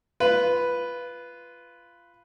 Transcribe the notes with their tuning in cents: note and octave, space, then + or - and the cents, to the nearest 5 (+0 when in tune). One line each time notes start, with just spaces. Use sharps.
F4 -15 B4 +0